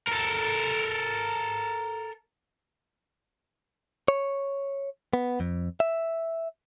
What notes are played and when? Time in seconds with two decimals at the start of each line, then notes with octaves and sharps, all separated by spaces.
0.07 A4 A#4
4.08 C#5
5.13 B3
5.40 F2
5.80 E5